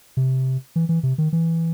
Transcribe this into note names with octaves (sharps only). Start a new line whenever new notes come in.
C3
E3
E3
C3
D#3
E3